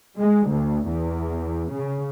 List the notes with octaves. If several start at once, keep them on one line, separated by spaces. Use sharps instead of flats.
G#3
D2
E2
C#3